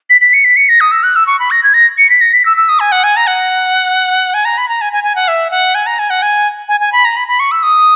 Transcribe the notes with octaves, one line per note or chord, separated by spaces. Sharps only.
B6
B6
C#7
B6
C#7
A#6
D#6
E6
F#6
E6
C#6
B5
A#6
G#6
A#6
C#7
B6
A#6
B6
E6
E6
D#6
G#5
F#5
G#5
A#5
F#5
G#5
A#5
B5
A#5
G#5
G#5
G#5
F#5
E5
F#5
G#5
A#5
G#5
F#5
G#5
G#5
G#5
B5
A#5
B5
B5
C#6
E6
D#6